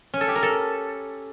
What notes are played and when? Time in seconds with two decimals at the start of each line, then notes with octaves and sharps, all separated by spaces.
0.14 C#4
0.21 A4
0.28 G4
0.35 A#4
0.43 A4